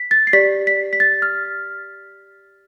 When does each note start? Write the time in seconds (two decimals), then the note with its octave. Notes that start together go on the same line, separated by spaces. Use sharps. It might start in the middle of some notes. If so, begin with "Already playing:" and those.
Already playing: B6
0.11 A6
0.27 C7
0.33 G4 D5 B6
0.67 B6
0.93 B6
1.00 A6
1.22 F6